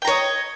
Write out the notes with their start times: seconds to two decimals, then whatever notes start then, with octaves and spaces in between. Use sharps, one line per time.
0.02 G5
0.05 A#5
0.08 C#5
0.10 D#5